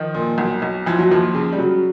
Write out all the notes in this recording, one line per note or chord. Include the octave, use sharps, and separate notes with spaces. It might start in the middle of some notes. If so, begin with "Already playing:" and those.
Already playing: D#3 F3
A#2
B1
B1
E3 F3
F#3
D#2 F3
C#3
G3
C#3 F#3